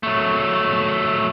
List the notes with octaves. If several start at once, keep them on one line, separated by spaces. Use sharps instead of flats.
F#3 A3